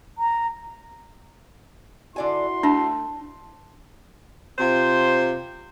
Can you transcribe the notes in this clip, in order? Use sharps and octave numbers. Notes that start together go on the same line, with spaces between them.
A#5
D3 E4 F#4 D5 G#5 C6
A3 D4
C3 F4 C5